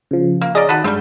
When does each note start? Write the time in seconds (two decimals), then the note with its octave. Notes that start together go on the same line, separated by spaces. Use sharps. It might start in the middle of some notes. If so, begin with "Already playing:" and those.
0.11 C#3 F3
0.41 A#3
0.55 C#4 G#4 D5 D#5 A#5
0.69 D#3 F#4 A4 B4
0.84 G2 G3 G#3 C4 G6